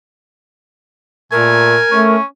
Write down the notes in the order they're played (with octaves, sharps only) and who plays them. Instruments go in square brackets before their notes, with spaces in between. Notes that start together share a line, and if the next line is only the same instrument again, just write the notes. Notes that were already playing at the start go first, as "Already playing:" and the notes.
[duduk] A#2 [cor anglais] A3 [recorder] A#4 [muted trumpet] G#5
[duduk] A3 [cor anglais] C#4